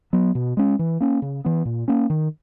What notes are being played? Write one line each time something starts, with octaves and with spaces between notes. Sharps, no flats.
F#3 B3
B2
G#3 C#4
E3
A#3 C#4
C#3
E3 B3
A#2
A#3 C#4
D#3